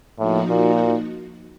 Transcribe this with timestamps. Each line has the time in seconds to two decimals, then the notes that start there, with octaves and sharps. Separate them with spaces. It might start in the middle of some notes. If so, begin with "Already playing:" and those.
0.18 A2 F3 A#3 D#4 F#4
0.50 A#2